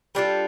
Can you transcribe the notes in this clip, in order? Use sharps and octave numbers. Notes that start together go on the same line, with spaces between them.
G3 D4 F4 A4